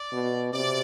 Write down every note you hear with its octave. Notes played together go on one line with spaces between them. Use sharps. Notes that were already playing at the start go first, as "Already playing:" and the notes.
Already playing: D5
B2
C3 D5